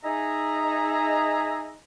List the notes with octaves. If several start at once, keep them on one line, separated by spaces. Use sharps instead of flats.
D#4 G#4 E5 A#5